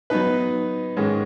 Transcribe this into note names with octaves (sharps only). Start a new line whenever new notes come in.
F#3 B3 D#4 B4
G#2 D#3 G#3 C#4